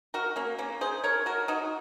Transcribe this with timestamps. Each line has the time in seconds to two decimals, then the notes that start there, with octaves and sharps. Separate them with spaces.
0.14 F#4 A#4
0.36 A#3 C#4
0.58 A#3 C#4
0.81 G#4 C5
1.03 A#4 C#5
1.26 F#4 A#4
1.48 D#4 F#4